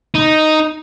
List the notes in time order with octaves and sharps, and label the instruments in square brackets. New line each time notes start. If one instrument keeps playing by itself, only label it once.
[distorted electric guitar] D#4